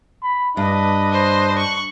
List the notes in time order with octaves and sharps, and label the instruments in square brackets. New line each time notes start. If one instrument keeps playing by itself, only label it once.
[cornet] B5
[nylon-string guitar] G2 [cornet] D4 [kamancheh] B4 D#5
[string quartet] C5
C#6 F#6